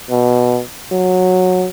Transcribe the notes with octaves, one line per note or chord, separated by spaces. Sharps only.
B2
F#3